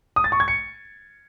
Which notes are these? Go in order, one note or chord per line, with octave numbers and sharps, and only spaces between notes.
D#6
A6
C#6
G#6
C#7